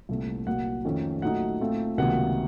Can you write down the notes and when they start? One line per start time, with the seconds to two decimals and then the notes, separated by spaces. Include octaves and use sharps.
0.09 C2 A#2 A3 C4
0.47 C2 A#2 F#3 A#3 F4 F#5
0.85 F2 D#3 A3 C#4
1.22 A#2 F#3 A3 D#4 F#5
1.60 A#2 A3 C4 F4
1.98 C#2 C3 D#3 F#3 A#3 F#5